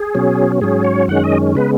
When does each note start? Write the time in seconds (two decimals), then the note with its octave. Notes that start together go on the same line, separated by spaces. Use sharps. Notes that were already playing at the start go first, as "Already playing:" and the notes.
Already playing: G#4
0.15 B2 F#3 C#4
0.61 G#2 F#3 C#4 G#4
0.84 C#5
1.08 F#2 D#3 G#3 C#4 F#5
1.24 D#5
1.55 C#3 G#3 B3 B4